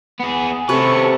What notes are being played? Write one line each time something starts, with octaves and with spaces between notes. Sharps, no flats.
B3 G#4
C3 C#4 A4 B4 C#6